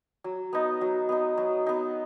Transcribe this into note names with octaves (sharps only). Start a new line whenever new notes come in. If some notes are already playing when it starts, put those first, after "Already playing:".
F#3
B3 D#4
F#3
B3 D#4
F#3
B3 D#4